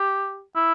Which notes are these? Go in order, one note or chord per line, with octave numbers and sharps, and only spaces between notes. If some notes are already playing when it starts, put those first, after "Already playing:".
Already playing: G4
E4